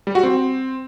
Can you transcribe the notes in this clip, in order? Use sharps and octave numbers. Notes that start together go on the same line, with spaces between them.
G3
F#4
C4